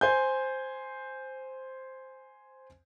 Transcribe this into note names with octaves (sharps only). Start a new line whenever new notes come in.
C5 G#5 G6